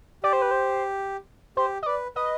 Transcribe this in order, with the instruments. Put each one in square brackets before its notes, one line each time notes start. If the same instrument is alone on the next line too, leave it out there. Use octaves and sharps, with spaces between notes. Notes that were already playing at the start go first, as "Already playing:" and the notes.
[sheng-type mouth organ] G4 [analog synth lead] D5
[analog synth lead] C5
B4
C5
[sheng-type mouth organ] G4 [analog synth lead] C5
[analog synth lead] D#5
[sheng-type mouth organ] B4 [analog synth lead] D5
[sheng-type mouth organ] B4 [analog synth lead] D#5